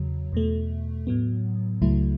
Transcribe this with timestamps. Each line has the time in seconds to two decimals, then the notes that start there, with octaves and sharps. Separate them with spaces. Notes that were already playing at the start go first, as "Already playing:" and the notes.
Already playing: E2 C#3 F#3
0.32 E2 B2 A3
1.07 A2 F#3 B3
1.81 C#2 C#3 F#3 A3 E4